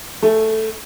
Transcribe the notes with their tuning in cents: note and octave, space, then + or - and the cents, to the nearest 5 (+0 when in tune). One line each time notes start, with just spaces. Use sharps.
A3 +0 G#4 +25